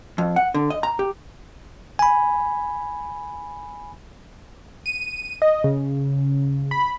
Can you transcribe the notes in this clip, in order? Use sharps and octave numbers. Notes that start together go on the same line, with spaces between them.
F2
F#5
D3
D#5
A#5
G4
G#5 B5
D#7
D#5
C#3
B5